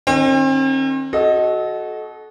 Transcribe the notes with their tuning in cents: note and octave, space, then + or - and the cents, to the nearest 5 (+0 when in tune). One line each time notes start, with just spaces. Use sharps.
D#3 -25 C4 +40
F#4 +0 A4 -30 D#5 +0